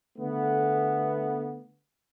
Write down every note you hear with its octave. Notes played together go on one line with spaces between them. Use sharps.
D3 A3 B3